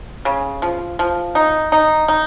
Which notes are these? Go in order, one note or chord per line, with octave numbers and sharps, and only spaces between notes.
C#3
F3
F3
D#4
D#4
D#4